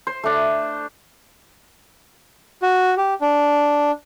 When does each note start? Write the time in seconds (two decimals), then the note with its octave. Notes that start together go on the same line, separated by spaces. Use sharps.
0.07 C5
0.24 A3 D4
2.62 F#4
2.97 G4
3.21 D4